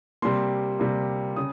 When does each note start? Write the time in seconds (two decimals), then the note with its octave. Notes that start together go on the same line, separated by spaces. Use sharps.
0.22 C3 G3 A#3 C6
0.79 C3 G3 A#3
1.36 C#3 D#6